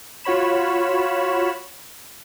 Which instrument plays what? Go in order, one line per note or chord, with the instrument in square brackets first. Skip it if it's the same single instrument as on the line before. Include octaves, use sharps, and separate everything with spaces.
[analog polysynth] F4 F#4 C#5 B5 E7